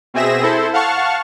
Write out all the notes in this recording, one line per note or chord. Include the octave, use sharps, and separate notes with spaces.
B2 C4 G#4 E5 A#6 E7
E4 A4 C5
F5 F#5 A5 C#6 F6